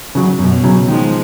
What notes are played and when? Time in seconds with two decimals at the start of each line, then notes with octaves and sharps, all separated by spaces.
0.15 C#3 F#3
0.39 F#2 B2
0.64 C#3 F#3
0.88 D#3 F3 G#3